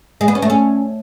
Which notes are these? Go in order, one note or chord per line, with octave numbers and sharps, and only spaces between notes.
G#3
B3
C#4
A3
C#4